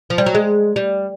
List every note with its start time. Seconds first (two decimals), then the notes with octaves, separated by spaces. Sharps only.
0.10 F3
0.18 G3
0.26 F#3
0.35 G#3
0.76 G3